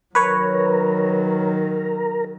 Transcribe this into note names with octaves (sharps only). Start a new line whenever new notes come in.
D#3 F#3 A#4 B4 C#5